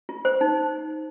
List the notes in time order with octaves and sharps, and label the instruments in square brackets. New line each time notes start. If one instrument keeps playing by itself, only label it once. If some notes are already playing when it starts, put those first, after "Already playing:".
[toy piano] F4
C5
D#4